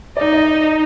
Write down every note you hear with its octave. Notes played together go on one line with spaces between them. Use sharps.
D#4 D5
D#5